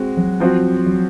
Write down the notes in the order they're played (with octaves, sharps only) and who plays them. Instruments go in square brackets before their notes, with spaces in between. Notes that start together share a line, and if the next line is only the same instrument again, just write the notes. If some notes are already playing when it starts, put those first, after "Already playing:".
Already playing: [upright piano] G#3 F#4 [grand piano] C4
[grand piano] F#3
[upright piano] F3 C4 F#4
[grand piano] F#3